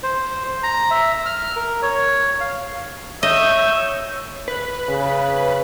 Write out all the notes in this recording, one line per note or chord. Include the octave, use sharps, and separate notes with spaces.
C5
A#5
E5
F6
A#4
C#5
F5
C#5 D#5 E5 E6 G6
B4
C#3